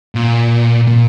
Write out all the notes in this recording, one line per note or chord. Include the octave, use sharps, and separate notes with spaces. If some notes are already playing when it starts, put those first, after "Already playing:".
A#2
A#2